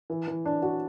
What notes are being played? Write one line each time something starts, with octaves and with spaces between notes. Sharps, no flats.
E3
E3
D4
F#4